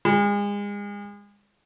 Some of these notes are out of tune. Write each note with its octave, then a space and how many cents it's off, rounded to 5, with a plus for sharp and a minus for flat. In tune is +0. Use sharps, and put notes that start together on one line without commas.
G#3 -35